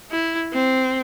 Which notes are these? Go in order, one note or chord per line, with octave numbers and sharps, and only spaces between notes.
E4
C4